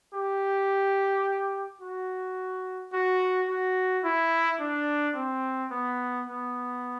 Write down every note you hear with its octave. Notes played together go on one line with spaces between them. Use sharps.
G4
F#4
F#4
F#4
E4
D4
C4
B3
B3